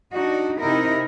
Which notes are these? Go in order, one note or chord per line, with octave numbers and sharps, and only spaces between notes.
D4 D#4 F#4
C3 D#4 E4 A#4